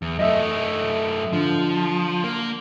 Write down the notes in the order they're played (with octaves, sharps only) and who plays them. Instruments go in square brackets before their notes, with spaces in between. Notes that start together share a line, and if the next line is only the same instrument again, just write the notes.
[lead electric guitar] E2
[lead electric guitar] F#2 A3 [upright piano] D#5 E5
[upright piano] D3 [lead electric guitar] F3
[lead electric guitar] A#3